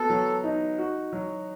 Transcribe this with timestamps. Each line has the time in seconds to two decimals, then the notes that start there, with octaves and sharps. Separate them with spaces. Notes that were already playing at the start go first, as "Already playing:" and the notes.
Already playing: B3 F#4 A4
0.10 F#3
0.44 D#4
0.78 F#4
1.13 F#3